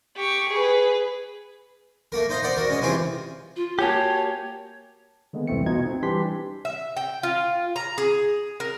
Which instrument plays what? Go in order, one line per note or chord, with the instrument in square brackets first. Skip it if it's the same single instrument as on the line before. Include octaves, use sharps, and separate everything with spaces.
[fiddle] G4 C#6
G#4 B4
[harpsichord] A3 A#3 A#4
D#4 C5 D#5 F5 A#5
C5 D5 F#5 A#5
F#4 A#4
G#3 C#4 D#5
C3 E3 C4 E4 F4 G#4
[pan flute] F4
[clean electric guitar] A#3 F#4 G4 [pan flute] C#5 [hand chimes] G#5 A5
[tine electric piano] D3 D#3 G#3 A#3 B3
C2 F2 E3 A3 C4 C#7
B2 D#4 F4 G#6
C4
E3 G3 D4 G4 C6 B6
[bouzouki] E5
G5
F4
A#5
G#4
A#4